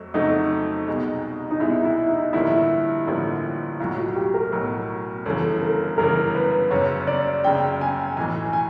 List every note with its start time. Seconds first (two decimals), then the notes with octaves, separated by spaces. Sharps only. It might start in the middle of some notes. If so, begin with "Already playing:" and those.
Already playing: F2 F#3 A3
0.14 F2 C#3 F#3 A3 D#4
0.87 C2 B2 G#3
1.51 D#4
1.60 C2 B2 G#3 E4
1.85 E4
2.09 D#4
2.33 A1 G2 D3 F3 A#3 E4
3.06 A1 G2 D3 F3 A#3
3.80 B1 A2 F#3 F4
3.97 F#4
4.16 G4
4.34 A#4
4.52 B1 A2 F#3
5.26 G1 F#2 C#3 E3 A4
5.62 A#4
5.98 G1 F#2 C#3 E3 A#4
6.35 B4
6.71 F#1 F#2 C#3 C#5
7.07 D5
7.44 F#1 F#2 C#3 G5
7.81 G#5
8.17 B1 A2 E3 G#5
8.53 G#5